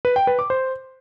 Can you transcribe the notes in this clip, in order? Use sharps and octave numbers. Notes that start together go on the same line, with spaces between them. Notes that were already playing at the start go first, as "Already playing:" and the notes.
B4
G5
B4
D6
C5